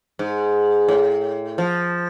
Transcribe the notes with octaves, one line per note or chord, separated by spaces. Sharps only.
G#2
A2
F3